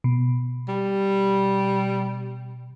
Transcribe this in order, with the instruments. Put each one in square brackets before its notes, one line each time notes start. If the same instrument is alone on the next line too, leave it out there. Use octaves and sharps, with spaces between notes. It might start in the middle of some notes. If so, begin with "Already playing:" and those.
[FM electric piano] B2
[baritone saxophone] G3